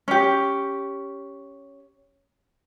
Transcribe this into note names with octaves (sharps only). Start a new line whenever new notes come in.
C#4 G4